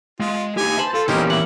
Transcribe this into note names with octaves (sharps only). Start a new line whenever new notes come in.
G#3 F4
D#4 G4 G#5
C5 A5 B5
F4 A4
E2 A#2 C#4 D#4 G4 A#4
E4 F#5